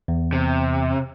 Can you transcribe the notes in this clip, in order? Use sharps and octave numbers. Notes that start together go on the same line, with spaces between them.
E2
C3